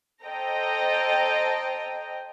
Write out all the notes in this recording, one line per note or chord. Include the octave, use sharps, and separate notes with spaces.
A4 C5 D#5 G5 A#5